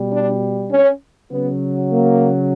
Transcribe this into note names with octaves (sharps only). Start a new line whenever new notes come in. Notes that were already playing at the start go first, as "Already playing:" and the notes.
Already playing: B2 G3
D4
C#4
C#3 F#3 B3
A#3